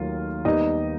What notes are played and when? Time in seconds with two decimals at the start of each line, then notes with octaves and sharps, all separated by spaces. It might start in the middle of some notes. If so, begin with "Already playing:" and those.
Already playing: D#2 D#3 F#3 A3 F4
0.45 D#2 D#3 G3 B3 D#4 D#5